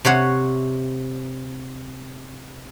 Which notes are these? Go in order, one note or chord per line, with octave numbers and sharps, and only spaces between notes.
C3 C5 C#5 F#5